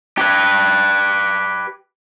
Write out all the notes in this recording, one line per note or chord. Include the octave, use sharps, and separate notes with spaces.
G4 B4